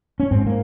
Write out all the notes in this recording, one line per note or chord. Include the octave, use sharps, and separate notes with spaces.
C#4
G#2 C4
A#3